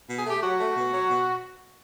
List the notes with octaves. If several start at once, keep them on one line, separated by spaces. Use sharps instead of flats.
B2
G#4
A3 G4
F#3 F#4
A3
B2
F#3
B2